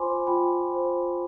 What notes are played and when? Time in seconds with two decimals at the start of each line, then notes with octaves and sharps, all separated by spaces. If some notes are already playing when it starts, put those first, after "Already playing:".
Already playing: F4 C5 G#5 B5 C6 D6
0.27 F4 G5 B5
0.74 C5